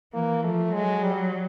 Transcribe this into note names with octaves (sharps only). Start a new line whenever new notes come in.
E3 A#3
F3 A3
F#3 G#3
G3